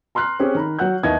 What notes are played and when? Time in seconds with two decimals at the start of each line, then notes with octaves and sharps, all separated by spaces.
0.15 A#5 C6 F6 F#6 C7
0.39 C4 C#4 G4 G#4
0.55 D#3 A#5 B5
0.79 F#3 C#5 F#5 F#6 G6
1.03 D#2 D#3 B3 E4 D#5 G#6